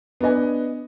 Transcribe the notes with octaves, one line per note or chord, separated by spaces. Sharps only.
B3 D4 B4 D#5 G#5